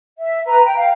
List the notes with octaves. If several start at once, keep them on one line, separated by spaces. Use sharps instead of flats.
E5
B4 A#5
G5
F5